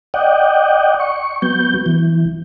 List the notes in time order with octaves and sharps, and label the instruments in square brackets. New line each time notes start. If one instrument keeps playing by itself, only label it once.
[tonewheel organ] D5 D#5 F#5 G5
C#6
F#3 B3 G6
E3